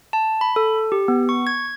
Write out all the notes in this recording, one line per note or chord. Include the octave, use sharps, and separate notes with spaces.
A5
B5
A4
G4
B3
C#6
G#6